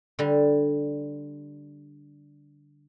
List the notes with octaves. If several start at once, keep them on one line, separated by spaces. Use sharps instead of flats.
D3 G3